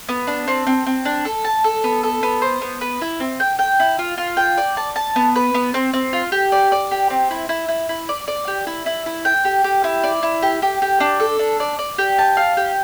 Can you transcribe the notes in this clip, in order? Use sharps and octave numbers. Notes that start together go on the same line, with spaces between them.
B3
D4
C4
C4
C4
D4
A4
A5
A4
B3
A4
B3
C5
B3
B4
E4
C4
G5
G5
E4
F4
F4
G5
D5
A5
A5
B3
B4
B3
C4
C4
F4
G4
D5
D5
G4
C4
E4
E4
E4
E4
D5
D5
G4
E4
E4
E4
G5
G4
G4
E4
D5
E4
G4
G4
G4
D4
A4
D4
D5
D5
G4
A5
F5
G4